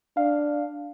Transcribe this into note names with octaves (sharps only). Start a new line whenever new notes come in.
D4 F5